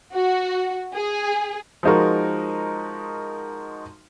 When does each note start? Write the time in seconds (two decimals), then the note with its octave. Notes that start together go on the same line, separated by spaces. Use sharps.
0.13 F#4
0.94 G#4
1.83 F3 G#3 D#4 F#4 A#4